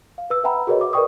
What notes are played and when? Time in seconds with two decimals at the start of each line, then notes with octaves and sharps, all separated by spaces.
0.18 F5
0.30 B4 E6
0.44 B4 E5 F#5 G5 A#5 B5
0.67 F#4 G#4 A#4 B4 C#5 D#5
0.81 E5 D6
0.93 A#4 B4 D5 G5 C#6 D#6